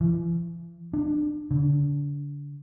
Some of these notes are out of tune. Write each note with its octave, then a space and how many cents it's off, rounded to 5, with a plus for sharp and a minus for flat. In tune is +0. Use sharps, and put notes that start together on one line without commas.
E3 +45
D4 +25
D3 -30